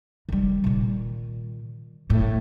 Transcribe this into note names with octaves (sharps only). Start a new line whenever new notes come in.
D#3 G3
A#2 D#3
G1 A2